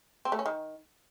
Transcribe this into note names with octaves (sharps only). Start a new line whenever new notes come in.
C4
A3
C#4
D#3